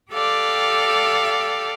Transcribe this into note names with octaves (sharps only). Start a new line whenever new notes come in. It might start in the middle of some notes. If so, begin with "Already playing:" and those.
G4 A4 D5 F5 G5